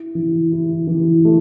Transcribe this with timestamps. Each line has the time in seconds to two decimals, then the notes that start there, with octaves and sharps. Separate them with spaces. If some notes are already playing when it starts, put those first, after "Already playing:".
Already playing: E4
0.15 E3
0.52 E4
0.87 E3
1.25 A3